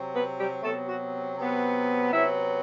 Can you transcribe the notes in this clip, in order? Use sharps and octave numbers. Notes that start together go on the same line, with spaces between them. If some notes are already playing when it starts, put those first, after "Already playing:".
Already playing: C3 F#3
B3 B4
G3 G4
C3 F#3 A3 B3 A4
F#4
C3 F#3 B3
C3 F#3 B3 E4 E5